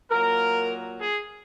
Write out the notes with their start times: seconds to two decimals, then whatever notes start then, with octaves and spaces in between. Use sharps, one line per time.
0.11 A#2 F#3 A#3 A#4
0.99 G#4